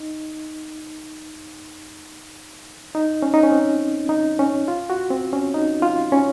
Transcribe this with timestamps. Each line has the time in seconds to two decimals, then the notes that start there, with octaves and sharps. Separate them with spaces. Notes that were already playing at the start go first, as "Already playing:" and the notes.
Already playing: D#4
2.95 D#4
3.22 C#4
3.34 D#4
3.43 C#4
3.52 C4
4.09 D#4
4.39 C#4
4.68 F4
4.90 F#4
5.11 C4
5.33 C#4
5.54 D#4
5.82 F4
6.12 C#4